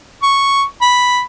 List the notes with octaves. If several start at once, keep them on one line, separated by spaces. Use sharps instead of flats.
C#6
B5